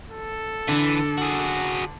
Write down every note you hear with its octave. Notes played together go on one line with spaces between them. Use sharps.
A4
D3 E3
F#4 G#4